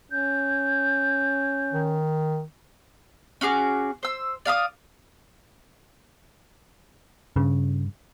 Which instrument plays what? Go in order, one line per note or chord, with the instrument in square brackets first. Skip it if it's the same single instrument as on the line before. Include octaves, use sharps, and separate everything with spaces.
[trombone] C#4 [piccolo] G6
[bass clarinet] D#3
[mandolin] C#4 F#4 G#4 D6
C5 E6
D5 F5 B5 D#6
[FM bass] G2 [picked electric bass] C#3